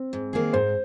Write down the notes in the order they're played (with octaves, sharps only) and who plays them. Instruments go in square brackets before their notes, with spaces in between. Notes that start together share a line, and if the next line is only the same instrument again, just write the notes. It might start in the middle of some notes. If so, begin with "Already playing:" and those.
Already playing: [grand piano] C4
[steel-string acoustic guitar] G#2
D#3 A#3 G#4
[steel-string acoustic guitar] G#2 [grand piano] C5